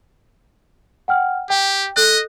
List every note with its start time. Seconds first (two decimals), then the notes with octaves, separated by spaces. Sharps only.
1.08 F#5 G5 F6
1.50 G4 G5
1.96 A4 D#5 F#6